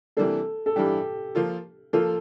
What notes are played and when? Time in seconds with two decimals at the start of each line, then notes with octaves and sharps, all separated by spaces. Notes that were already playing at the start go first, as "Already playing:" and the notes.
0.17 C3 E3 G3 A#3 D4 A4
0.66 A4
0.76 G2 E3 G3 D4 G4
1.35 F3 A#3 F4 A4
1.93 F3 A#3 F4 A4